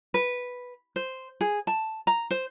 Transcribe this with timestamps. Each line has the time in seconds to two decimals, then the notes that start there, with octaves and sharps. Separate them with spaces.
0.14 B4
0.96 C5
1.41 G#4
1.67 A5
2.07 A#5
2.31 C5